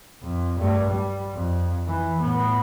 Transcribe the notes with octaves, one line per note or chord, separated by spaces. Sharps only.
F2
G2 A3
G3
F2
E3
A2 B3